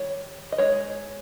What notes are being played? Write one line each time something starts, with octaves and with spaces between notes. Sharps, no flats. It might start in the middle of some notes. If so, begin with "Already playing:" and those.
Already playing: D#3 G3 C#5
D#5
G#3 D#4 C#5